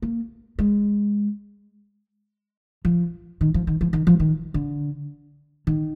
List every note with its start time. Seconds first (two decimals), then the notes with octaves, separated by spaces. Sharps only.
0.02 A#3
0.59 G#3
2.85 F3
3.41 D#3
3.54 F3
3.67 D#3
3.81 F3
3.93 D#3
4.07 F3
4.20 D#3
4.54 D3
5.67 D#3